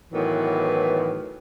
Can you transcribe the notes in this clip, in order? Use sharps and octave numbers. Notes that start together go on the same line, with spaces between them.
A2 D#3 E3 F#3 B3